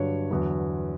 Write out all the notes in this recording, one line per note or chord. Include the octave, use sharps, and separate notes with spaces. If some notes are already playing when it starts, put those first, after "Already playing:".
Already playing: G2 D3 F#3 C#5
E2 D3 F#3